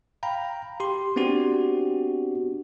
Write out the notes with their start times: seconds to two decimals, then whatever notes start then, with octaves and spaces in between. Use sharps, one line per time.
0.23 F5 G5 A#5 B5
0.80 G4 C6
1.16 B3 C4 D4 F#4 G4